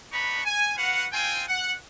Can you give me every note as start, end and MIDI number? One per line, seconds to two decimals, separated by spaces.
0.12 0.41 59
0.12 0.41 62
0.12 0.41 63
0.12 0.41 83
0.12 0.41 85
0.45 0.72 80
0.78 1.06 66
0.78 1.06 71
0.78 1.06 77
0.78 1.06 78
1.13 1.43 60
1.13 1.43 65
1.13 1.43 79
1.13 1.43 80
1.48 1.73 78